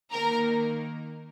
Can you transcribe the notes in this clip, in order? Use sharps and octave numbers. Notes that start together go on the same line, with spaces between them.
D#3 A#3 A#4 A#5